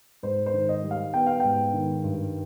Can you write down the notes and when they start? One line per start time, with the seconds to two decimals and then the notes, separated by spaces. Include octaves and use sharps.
0.23 G#2 C5
0.46 C5
0.54 D#3
0.69 D#5
0.83 G3
0.91 F5
1.14 B3 G5
1.26 F5
1.40 G#2 G5
1.73 D#3
2.04 G2